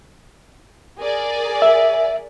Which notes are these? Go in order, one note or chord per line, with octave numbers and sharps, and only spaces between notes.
G#4 A#4 D5
E5